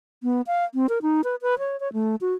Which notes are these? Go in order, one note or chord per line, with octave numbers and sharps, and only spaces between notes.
B3
F5
C4
A#4
D#4
B4
B4
C#5
C#5
A3
F#4